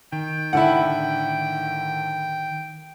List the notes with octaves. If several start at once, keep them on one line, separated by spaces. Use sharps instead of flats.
D#3 G5
A2 D3 E4 F#5